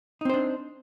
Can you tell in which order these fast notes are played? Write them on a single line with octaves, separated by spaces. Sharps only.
D#4 C4 C5 D4